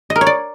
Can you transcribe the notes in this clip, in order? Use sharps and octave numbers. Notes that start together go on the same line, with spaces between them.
D#5
A#4
C#5
D5